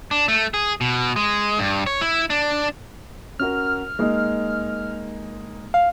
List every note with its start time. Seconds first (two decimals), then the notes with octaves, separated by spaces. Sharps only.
0.11 D4
0.28 A3
0.54 G#4
0.81 B2
1.16 G#3
1.59 G2
1.86 C#5
2.01 E4
2.30 D4
3.40 C#4 F#4 A#4 F6
3.99 G#3 A#3 D#4
5.74 F5